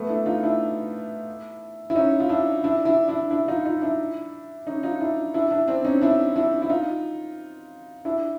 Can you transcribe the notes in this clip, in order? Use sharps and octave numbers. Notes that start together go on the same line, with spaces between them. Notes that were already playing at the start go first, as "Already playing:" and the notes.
Already playing: A3 B3
D4 E4
D#4 F4
D4 E4
E4
C#4 D#4
F4
D4 E4
D4 E4
D4 E4
D4 E4
D4 E4
D#4 F4
D#4 F4
D4 E4
C#4 D#4
D#4 F4
D4 E4
D4 E4
D4 E4
C4 D4
C#4 D#4
D4 E4
D4 E4
E4
D#4 F4
D4 E4